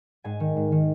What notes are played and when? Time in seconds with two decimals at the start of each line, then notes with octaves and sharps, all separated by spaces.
0.24 G#2 G#5
0.40 D#3
0.56 G#2
0.72 D#3